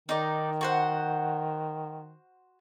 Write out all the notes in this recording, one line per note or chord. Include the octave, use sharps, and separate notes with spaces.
D#3 D#4 D5
F#4 C5 F#5